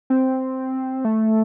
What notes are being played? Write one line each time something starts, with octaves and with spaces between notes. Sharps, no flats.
C4
A3